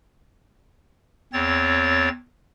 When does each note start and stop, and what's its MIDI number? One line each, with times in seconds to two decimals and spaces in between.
1.33 2.09 40
1.33 2.09 60
1.33 2.09 73
1.33 2.09 93